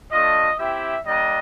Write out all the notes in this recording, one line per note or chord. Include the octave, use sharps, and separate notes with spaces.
A3 D4 F4 D#5
C4 E4 G4 E5
G3 A#3 D4 D#5